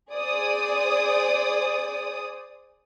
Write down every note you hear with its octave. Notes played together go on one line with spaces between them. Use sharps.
G#4 C5 D5 D#6